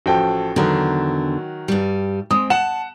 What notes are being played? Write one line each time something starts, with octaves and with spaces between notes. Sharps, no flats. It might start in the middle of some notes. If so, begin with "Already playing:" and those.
A1 F3 F#4 A4 G5
E2 D3 D#3 F#3
G2 G3
G#3 C4 D#6
F#5 A5 E7